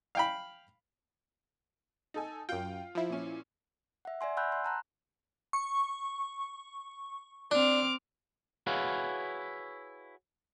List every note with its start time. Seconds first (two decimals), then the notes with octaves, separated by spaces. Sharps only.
0.15 F5 G5 B5
2.14 D#4 A4 G#5
2.49 F#2 F4 G5
2.95 F3 E4
3.09 A#2 C#4
4.05 E5 F#5
4.21 D5 E5 G#5 C6
4.37 F#5 G#5 B5 E6 F#6 G6
4.52 C6
4.64 A5 A#5 F#6
5.53 C#6
7.51 C4 D4 D6 F6
8.67 E4 F#4 G#4 B4 C#5 F5